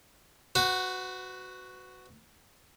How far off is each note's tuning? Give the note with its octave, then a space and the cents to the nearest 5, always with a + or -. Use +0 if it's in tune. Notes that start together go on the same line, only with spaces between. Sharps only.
F#4 +0 B4 +30